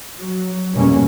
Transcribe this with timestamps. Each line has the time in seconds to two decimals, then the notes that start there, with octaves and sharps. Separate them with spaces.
0.19 F#3
0.74 F1 E2 G2 B2 A#3 C#4